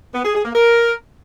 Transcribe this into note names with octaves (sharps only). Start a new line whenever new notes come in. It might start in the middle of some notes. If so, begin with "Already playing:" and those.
B3
G#4
G#4
A#3
A#4